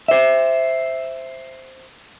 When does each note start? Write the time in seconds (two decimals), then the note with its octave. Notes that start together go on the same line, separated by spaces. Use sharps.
0.08 C5 E5